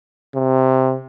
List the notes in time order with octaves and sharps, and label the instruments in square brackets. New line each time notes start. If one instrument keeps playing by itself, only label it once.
[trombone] C3